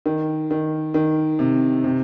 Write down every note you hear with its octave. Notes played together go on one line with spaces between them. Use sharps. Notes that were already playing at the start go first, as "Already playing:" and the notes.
D#3
D#3
D#3
C3
C3